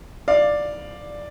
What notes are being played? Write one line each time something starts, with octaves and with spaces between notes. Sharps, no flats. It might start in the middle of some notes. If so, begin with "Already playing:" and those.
D5 F5